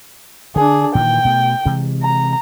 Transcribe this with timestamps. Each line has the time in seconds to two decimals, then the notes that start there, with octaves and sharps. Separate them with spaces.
0.56 D3 D4 G#4
0.95 A#2 D#3 E3 G5
1.25 B2 A3
1.66 C3 E3 G#3
2.03 A#5